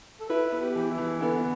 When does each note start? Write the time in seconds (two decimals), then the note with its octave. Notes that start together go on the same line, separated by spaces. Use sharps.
0.20 A4
0.29 E4 B4
0.52 B3
0.60 G4
0.75 E3
0.90 E4
0.98 E3
1.21 D3 B3